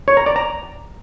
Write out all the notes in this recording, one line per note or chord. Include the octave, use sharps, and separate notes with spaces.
C#5
A#5
D5
A#5